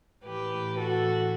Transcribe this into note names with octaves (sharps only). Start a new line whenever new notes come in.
A2 E3 G4 B4
F#4 A4